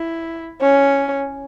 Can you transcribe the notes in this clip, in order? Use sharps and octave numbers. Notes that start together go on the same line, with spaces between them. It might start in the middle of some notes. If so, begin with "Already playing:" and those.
Already playing: E4
C#4